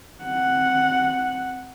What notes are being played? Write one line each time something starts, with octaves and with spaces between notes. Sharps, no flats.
C4 F#5